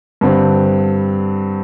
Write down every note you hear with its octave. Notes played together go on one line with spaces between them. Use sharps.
G2 D3 G3 C4